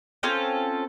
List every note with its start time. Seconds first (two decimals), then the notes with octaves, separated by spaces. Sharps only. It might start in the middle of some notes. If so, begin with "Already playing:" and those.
0.23 C4 C#4 F4 A4